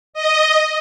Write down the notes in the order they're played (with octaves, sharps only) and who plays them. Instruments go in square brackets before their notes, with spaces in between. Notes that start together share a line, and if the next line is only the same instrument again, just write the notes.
[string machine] D#5